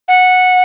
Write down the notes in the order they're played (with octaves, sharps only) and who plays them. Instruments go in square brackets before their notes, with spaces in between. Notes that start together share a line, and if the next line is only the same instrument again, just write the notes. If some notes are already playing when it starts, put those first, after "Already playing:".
[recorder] F#5